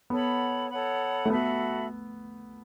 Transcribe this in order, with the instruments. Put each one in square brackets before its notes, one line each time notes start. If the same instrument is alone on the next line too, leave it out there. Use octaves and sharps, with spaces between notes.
[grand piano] B3 [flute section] A4 C#5 F#5 B5
[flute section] A4 C#5 F#5 B5
[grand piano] A3
[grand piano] B3 [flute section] F#4 A4 E5 B5